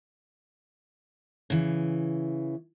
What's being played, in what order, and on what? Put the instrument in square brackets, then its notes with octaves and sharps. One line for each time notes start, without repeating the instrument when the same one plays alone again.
[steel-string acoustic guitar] C#3 E3